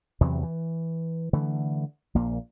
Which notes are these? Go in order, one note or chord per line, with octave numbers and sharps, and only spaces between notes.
E2 C3 E3 F#3
E3
D3 E3 A3
A#1 A#2 A#3